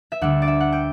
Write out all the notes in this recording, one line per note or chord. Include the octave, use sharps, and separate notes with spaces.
E5
D2 D3 G3 F#5
D5
E5
F#5
G5